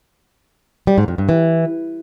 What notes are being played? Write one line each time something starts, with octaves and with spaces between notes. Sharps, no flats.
G3
G#2
F2
G2
E3